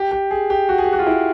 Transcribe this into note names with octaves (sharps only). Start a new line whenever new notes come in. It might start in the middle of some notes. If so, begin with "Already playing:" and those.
Already playing: G4
G4
G#4
G4
F#4
G#4
G4
F#4
F4
E4